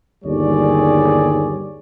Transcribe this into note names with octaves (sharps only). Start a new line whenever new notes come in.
G1 D#2 G3 G#4 C#5 D5